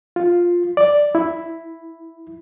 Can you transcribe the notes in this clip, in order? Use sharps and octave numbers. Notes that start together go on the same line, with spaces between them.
F4
D5
E4